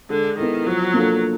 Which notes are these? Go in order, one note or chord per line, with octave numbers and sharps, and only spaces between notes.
D3 G#3
D#3 B3 E4 A4
F3 F#3
A#3 D4 F4 A4